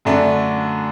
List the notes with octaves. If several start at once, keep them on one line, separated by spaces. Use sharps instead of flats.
F#2 D3 A3 D4